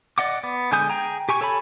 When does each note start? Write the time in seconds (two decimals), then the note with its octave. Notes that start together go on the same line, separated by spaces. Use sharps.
0.18 D5 D#5 F#5 D6
0.44 B3
0.72 D3 G#3 G#5 D#6 G6
0.90 G#4 G5 A#5
1.29 G4 G#5 C#6
1.41 A4 C#5 G#5 A5 B5